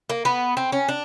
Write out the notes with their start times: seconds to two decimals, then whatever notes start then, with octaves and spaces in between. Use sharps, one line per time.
0.09 A#3
0.25 B3
0.57 C4
0.72 C#4
0.89 D4